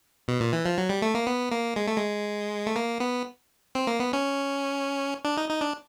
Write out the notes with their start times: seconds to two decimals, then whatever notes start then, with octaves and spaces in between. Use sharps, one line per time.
0.28 B2
0.40 A#2
0.53 E3
0.66 F3
0.78 F#3
0.89 G3
1.02 A3
1.15 A#3
1.27 B3
1.52 A#3
1.76 G#3
1.87 A3
1.97 G#3
2.67 A3
2.76 A#3
3.00 B3
3.75 C4
3.87 A#3
4.00 B3
4.13 C#4
5.25 D4
5.37 D#4
5.50 D#4
5.61 D4